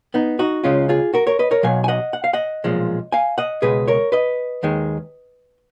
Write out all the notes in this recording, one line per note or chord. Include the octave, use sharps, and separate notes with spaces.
B3 D#4
D#4 F#4
C#2 C#3 G#3 C#4 F4
F4 G#4
F#4 A#4
A#4 C#5
B4 D#5
A#4 C#5
B1 B2 F#3 F5 G#5
G#5
D#5 F#5
F#5
F5
D#5 F#5
B1 A#2 F3 G#3
F5 G#5
D#5 F#5
C#2 B2 G#3 G#4 B4
A#4 C#5
B4 D#5
D#2 D#3 G#3